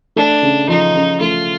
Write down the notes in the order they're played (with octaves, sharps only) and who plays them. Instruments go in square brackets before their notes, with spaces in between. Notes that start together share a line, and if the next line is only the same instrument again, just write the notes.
[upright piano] A3 [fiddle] D4
[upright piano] C#3
[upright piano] F3 [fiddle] D#4
[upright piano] C#3
[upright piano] A3 [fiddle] F4